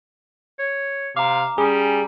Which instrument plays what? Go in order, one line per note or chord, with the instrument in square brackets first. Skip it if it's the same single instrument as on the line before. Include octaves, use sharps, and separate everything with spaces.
[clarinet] C#5
[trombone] C3 [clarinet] F5 [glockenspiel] A#5 D6
[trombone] G3 [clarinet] C#4 [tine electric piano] G#4